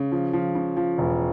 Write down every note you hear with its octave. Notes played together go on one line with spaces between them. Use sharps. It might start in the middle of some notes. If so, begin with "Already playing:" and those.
Already playing: C#3
F3
F3
C#3
F3
E1